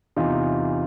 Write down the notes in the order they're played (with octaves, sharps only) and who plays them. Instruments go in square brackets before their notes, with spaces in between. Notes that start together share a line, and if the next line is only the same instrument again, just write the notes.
[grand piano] E2 C3 E3 D#4 F4